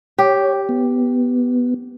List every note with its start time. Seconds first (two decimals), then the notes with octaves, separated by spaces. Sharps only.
0.19 G4 C#5
0.69 B3